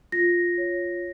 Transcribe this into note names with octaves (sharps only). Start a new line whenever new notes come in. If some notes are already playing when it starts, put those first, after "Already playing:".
F4 A#6
C#5